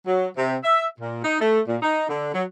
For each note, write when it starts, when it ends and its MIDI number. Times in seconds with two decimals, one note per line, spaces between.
0.07 0.27 54
0.37 0.56 48
0.64 0.85 76
0.99 1.24 46
1.24 1.36 63
1.40 1.60 57
1.68 1.76 46
1.82 2.08 63
2.09 2.33 50
2.34 2.43 54